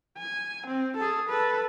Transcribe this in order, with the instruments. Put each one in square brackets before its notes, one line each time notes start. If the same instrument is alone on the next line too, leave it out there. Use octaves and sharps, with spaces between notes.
[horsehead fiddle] G#5
C4
G#4 A4
A4 B4